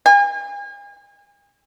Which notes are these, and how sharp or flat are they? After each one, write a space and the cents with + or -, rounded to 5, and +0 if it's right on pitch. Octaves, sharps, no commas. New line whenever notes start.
G#5 -45